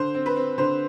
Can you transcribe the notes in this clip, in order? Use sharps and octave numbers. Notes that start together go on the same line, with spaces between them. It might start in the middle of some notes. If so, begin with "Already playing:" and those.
Already playing: D3 C5
C4
B4
C4
D3 C5